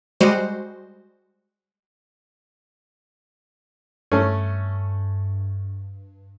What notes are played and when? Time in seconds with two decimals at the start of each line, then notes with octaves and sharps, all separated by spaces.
0.21 G3 G#3 F#4 C5
4.12 G2 A3 C#4